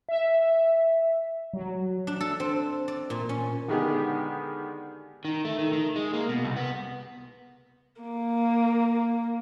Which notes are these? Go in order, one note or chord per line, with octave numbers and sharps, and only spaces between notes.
E5
F#3
D4
A4
C4
D5
A#2
C#4
D3 D#3 G#3 B3 G4 G#4
D#3
A3
D#3
D#3
G#3
A#3
B2
C2
B3
A#3